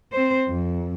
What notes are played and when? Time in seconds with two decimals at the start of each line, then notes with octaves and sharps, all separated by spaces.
0.12 C4 C5
0.48 F2